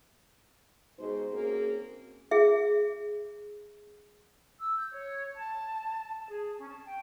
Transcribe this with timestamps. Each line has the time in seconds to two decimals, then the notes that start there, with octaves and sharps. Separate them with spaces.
0.99 B2 G#3 D#4 G#4 C5
1.33 A#3 C4 C#4 F#4 G#4
2.31 G#4 E5
4.59 E6
4.76 G6
4.91 C#5
5.36 A5
6.07 A5
6.29 G#4
6.58 C#4
6.69 A5
6.86 G5